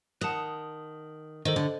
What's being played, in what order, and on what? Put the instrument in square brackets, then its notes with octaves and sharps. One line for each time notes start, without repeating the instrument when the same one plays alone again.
[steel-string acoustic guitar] D#3 [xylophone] F#5 A5 D#6 F#6
[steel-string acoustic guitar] D#3 [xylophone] A4 C5 D#5
[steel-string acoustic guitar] D3